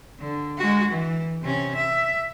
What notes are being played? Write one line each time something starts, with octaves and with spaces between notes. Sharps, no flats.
D3
G#3 F#4
E3
C3 C#4
E5